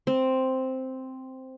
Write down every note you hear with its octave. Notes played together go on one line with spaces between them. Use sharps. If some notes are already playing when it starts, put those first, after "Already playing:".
C4